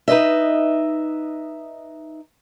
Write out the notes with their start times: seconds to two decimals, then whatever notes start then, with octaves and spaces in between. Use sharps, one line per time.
0.08 D#4 B4 C#5 D#5 E5